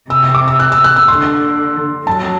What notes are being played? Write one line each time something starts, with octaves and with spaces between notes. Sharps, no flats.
C3 E6
D6
E6
F#6
E6
F#6
E6
D3 C6
F#3 A5